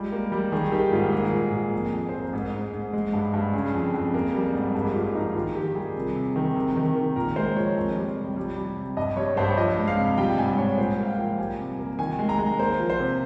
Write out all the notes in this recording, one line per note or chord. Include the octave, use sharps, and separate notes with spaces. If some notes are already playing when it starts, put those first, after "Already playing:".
Already playing: G3 G#3 F4
A#3
G3
D#3 G#4
D#3 G4
G#2 F4
A#3 G#4
A#2
A#2
F2
F2
F2 C5
A#4
G#2 G#4
G#2
G#2
G#3
G2
G2
C#3 G#4
F2
F2
A#3
G3
G#2
G2 G#4
G4
A#3 F4
F3 D#4
D#3 F4
D#3 G4
G3 G#4
C3
C3
D#3
C3
D#3
D#3
A#2 A#4
G#3 C5
F3 C#5
F2
G3
C3
G3
G3
C3
G2 D#5
G3 C#5
G2 C5
C#5
F3 D#5
G#3
F5
C3
G3 G5
G#2 G#5
G#2 C#5
A#2 C5
A#3 F5
G5
F3
G3 G#5
C3
A#3
D#3 G#5
G#3
A#5
G#3
A#3 C5
F3
C5
C3